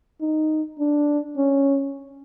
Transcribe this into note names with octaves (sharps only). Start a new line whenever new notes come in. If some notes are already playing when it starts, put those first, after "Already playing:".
D#4
D4
C#4